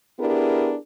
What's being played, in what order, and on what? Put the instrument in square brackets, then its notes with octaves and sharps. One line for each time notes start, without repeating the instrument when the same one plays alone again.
[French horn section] B3 D4 E4 G4 G#4 A#4